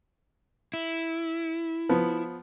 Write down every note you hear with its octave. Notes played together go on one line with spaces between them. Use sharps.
E4
F3 B3